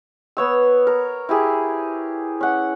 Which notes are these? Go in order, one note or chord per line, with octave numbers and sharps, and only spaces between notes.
B3 C#5 E6
A#4
E4 G4 G#4
C#4 F#5